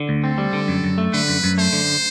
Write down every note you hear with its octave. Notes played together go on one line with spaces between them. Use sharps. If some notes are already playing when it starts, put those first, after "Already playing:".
Already playing: D3
D2
C4 A4
G3
D3
F#2
F#2
A3
D3 B4
F#2
F#2
A3 C5
D3